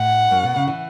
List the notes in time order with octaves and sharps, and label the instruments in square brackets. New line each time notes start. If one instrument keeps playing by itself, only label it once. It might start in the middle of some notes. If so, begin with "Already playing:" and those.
Already playing: [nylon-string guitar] A2 [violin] F#5
[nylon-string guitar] F#2
B2
C#3
E3